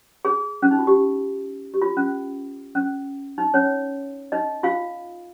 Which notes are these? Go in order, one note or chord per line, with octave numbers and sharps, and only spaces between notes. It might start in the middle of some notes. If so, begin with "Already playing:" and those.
G#4
C#4
D#4
F4
G4
G4
F4
C#4
C#4
D#4
C#4 C#5
D#4 D#5
F4 F5